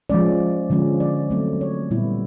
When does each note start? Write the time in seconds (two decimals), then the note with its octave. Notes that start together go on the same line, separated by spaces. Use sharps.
0.10 F3 G#3 C#4 D5
0.70 D3 F3 G#3 C#4
1.00 D5
1.30 F#3 A3 C4
1.61 C#5
1.91 A#2 G3 B3 E4